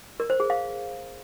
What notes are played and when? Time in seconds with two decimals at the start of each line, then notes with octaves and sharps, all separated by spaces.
0.20 A#4
0.30 C5
0.40 G#4
0.50 F5